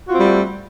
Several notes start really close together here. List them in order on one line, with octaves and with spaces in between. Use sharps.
F#4 F4 C4 G3 A3